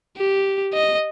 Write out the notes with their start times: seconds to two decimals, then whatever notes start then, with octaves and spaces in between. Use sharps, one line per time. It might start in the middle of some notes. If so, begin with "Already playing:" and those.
0.17 G4
0.74 D#5